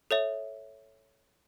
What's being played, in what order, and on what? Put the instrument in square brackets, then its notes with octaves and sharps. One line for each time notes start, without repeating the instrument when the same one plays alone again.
[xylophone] A4 C#5 E5